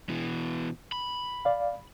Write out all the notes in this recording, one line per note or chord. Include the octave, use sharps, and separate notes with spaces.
B2 E3
B5
D5 F5